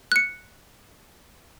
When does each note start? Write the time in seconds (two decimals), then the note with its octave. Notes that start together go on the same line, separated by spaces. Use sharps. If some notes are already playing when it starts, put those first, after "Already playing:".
0.12 F#6 C#7